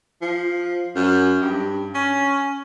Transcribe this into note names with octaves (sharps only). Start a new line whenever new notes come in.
F3
F#2
G2
C#4